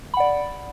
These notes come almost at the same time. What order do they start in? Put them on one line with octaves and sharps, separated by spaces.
B5 F#5 D5